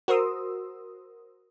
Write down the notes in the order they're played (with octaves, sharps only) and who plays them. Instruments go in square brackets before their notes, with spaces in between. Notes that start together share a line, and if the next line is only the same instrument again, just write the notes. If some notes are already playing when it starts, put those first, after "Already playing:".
[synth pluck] F#4 A#4 C5 C6 D#6 E6